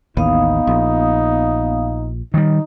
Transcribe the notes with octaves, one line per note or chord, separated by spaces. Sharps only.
A1 D#2 B3 D#4 F5 D#6
A#1
D#3 G3 D#4